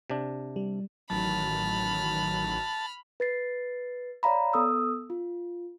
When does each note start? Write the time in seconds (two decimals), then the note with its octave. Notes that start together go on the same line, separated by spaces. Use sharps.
0.10 C3 D4
0.56 G3
1.10 A1 D#3 F#3 A5 B5 F6
3.20 B4 A6 C7
4.23 C#5 D5 F5 A#5 B5
4.53 B3 A4 D#6 E6
5.10 F4